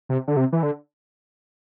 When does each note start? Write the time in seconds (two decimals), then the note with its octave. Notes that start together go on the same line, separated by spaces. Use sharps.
0.09 C3
0.28 D3
0.37 C3
0.52 E3
0.63 D3